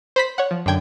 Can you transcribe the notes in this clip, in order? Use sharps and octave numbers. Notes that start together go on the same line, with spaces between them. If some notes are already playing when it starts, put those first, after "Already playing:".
C5 B5 B6
C#5 F#5
F3
F#2 D3 G5 G#6